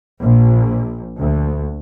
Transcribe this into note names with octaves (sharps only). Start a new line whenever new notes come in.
A#1
D2